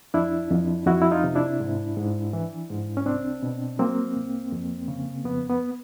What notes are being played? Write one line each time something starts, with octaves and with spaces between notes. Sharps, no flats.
F2 D4 E4
F2
F2 E4 F#4
E4
D#4 F4
C3
D4 E4
G#2
G#2
E3
G#2
C#4
C2 C4 D4
B2
F#3 A#3 C4
C2
F2
C#3
F2 B3
B3